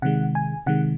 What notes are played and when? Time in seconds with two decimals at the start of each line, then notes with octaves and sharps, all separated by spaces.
0.02 C3 D#3 G#3 F#5
0.35 G#5
0.66 C3 D#3 G#3 F#5